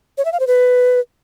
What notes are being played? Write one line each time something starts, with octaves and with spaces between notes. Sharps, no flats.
C#5
E5
F5
C5
B4